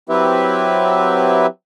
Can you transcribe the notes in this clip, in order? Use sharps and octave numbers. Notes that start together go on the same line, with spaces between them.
F#3 C4 E4 G4 B4 E5